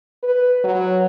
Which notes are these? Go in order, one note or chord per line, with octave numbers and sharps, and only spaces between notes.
B4
F#3